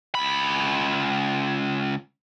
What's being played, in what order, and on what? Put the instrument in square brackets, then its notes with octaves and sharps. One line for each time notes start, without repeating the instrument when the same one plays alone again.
[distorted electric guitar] C#2 B5